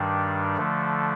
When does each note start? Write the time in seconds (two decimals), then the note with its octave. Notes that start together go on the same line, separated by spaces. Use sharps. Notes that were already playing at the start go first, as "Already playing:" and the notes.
Already playing: G2 D#3 G3 D4
0.57 D3 F3 A3